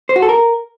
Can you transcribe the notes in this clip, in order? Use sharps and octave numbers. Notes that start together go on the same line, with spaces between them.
C5
F#4
A4
A#4